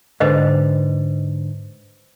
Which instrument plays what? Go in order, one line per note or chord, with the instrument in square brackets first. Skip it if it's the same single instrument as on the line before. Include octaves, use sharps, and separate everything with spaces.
[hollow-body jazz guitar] G#2 D3 [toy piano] B4 C5 D#5